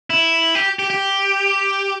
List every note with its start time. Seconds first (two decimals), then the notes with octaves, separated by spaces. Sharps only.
0.10 E4
0.55 G4
0.79 G4
0.90 G4